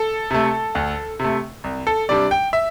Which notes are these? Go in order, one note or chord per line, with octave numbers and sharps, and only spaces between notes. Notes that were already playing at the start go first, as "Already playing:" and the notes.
Already playing: A4
C3 A3
D2
C3 A3
C2
A4
C3 G3 D4 D5
G5
E5